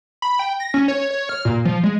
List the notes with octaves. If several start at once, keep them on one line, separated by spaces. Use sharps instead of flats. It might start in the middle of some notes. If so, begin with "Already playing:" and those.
B5
G5
A#6
C#4
C#5
C#5
F6
A#2
F3
G#3